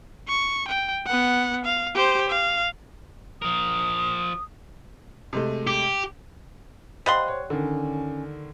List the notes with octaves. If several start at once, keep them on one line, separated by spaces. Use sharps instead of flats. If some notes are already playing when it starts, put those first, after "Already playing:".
C#6
G5
B3 F#5
F5
G4 C5
F5
F3 A#4 D#6
C3 G#3 A3
G4
G3 C5 D#5 F5 F#5 B5 C6
C#5
D3 D#3 C#4